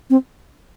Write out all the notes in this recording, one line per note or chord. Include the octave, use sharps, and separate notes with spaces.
C4